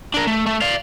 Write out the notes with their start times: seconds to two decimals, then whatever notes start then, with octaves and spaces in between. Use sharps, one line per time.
0.14 D4 A#4
0.27 A3
0.47 A3
0.62 D5 F5